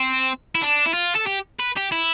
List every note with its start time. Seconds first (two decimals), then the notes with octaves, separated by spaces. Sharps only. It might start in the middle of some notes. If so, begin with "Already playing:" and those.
Already playing: C4
0.55 E4
0.62 D4
0.86 E4
0.94 F4
1.16 A4
1.27 G4
1.59 B4
1.76 G4
1.92 E4